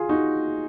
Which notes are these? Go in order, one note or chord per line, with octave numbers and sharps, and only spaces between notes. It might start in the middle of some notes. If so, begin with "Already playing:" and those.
Already playing: F4 G#4
D#4 F#4